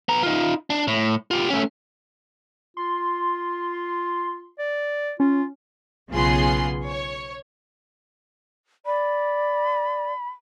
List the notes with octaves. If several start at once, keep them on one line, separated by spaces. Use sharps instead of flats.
B3 A#5
D#4 F4
D4
A2
F4 G4
A3 C#4
F4 C6
D5
C#4 F4
B1 C#3 B3 F4 G#4 C6
C#5
D5 B5